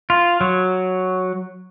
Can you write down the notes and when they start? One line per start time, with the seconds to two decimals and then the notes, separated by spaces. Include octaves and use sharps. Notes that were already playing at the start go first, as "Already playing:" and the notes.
0.10 F4
0.41 F#3